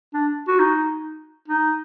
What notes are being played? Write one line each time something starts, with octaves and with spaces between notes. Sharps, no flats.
D4
F#4
D#4
D#4